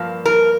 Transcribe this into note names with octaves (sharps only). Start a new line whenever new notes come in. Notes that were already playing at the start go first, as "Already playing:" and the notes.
Already playing: G2 F3 A#3
A#4